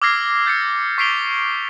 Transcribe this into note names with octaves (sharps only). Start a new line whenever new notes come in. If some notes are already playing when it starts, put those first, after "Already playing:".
D6 E6 F6 G#6 A#6 C7
G6 A6 C7 C#7
C#6 B6 C7 D7 F7 G7